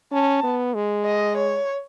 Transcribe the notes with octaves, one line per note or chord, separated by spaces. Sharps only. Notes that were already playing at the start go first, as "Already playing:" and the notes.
C#4 A5
B3
G#3
D#5
C#5